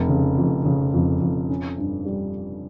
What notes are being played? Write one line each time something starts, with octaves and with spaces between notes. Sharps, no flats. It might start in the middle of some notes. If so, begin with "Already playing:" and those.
Already playing: F1
C#3
F2
C#3
F2
F2
C#4
G2
G3